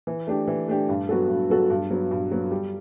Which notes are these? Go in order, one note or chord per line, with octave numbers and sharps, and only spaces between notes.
E3
A3 D4 G4
E3
A3 D4 G4
G2
F#3 B3 F#4 A4
G2
F#3 B3 F#4 A4
G2
F#3 B3
G2
F#3 B3
G3